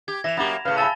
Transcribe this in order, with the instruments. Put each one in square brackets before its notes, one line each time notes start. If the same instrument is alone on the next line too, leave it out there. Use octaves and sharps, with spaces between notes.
[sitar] G4 [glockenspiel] G#6
[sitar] E3 [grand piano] E5 [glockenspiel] A#6 E7 F7
[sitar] F#2 A#3 G4 [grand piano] F#5 B5 A6
[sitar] A2 C#3 [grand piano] B4 [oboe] F5
[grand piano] F5 G#5 B5 [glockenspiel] A5 A6 G7 [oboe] E6